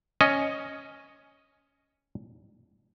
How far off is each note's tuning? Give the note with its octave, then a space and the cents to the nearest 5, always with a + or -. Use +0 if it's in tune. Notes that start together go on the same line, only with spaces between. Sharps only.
C#4 +0 D#5 +0